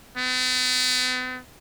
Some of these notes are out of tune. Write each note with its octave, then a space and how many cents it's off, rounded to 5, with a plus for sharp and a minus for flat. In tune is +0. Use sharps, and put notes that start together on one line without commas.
B3 +45